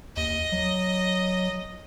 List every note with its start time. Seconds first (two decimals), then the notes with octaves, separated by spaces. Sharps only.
0.17 D#2 D#5
0.52 F#3